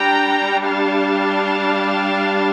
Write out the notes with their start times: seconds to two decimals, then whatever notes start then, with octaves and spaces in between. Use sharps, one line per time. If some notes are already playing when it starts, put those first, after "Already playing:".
Already playing: G3 D4 G5 A#5
0.66 F5 A5